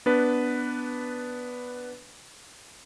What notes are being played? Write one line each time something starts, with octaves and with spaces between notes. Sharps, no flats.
B3 D4 B4